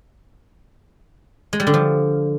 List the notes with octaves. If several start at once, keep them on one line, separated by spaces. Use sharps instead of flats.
G#3
G3
D3
F3